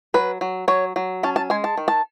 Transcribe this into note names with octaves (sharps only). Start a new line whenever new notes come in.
F#3 B4
F#3
F#3 C#5
F#3
C#4 A5
A5
G#3 G#5
A5
D#3
A5